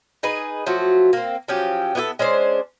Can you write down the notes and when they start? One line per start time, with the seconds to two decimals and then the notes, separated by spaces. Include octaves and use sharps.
0.23 D#4 G#4 B4
0.66 F3 F#3 A3 F#4
1.13 A#3 C4
1.48 F3 F#3 C#4 G4
1.95 B3 E4 G4 A4
2.19 G#3 C#4 D4 C5